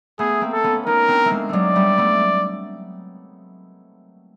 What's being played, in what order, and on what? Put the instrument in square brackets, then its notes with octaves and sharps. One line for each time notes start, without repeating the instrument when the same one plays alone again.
[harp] A3 B3 [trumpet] G#4
[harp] A#3 C4
[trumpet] A4
[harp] B3 C#4
[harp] C#4 D#4 [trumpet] A#4
[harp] C4 D4
A3
G#3 A#3
[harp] F#3 G#3 A3 [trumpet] D5
[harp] G3 A3
A3 B3